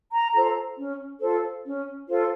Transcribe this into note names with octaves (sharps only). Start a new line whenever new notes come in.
A#5
F4 A4 C5 A#5
C#4
F4 A4 C5
C#4
F4 A4 C5